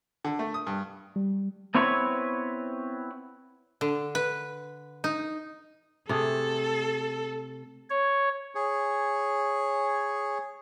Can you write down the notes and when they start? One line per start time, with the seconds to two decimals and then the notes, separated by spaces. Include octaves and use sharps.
0.24 D3
0.39 A3
0.54 D#6
0.67 G2
1.16 G3
1.75 B3 C4 E4 B4 C#5
3.81 D3
4.15 B4
5.04 D#4
6.09 C3 A3 G#4 A4
7.90 C#5
8.55 G#4 C#5